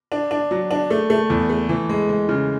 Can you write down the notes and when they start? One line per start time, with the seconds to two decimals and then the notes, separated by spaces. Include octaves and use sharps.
0.12 D4
0.31 D4
0.51 F#3
0.71 D4
0.90 A3
1.10 A3
1.30 E2
1.50 A3
1.69 E3
1.89 G#3
2.09 G#3
2.29 C#3